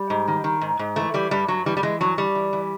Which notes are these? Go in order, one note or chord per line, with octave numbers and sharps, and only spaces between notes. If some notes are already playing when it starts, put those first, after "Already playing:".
Already playing: G3
G#2
D#3
D#3
G#2
G#2
E3 A3
E3 G3
G2 G3
G2 F#3
E3 G3
G3
E3 G#3
G2 F#3
G2 G3
E3
E3